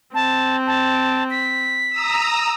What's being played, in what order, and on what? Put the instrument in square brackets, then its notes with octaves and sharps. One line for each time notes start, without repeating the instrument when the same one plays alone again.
[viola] C4 [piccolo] A5
[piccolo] A5
B6
[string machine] A#5 D#6 E6